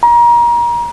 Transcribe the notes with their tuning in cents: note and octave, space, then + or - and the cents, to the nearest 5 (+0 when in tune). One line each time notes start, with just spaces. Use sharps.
A#5 +30